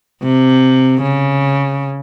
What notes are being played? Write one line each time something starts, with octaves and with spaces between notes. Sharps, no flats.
C3
C#3